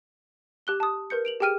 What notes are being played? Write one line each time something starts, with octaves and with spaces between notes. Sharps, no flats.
G4 F#6 G7
A5 D#6
A#4 B4 G6 C#7
D7 F7 F#7
G4 G#4 G5 F6 D#7